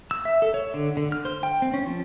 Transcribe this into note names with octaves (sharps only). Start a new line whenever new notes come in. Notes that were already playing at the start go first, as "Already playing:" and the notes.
E6
E5
A4
C#5
D3
D3
F6
C5
G5
C4
C#4
F3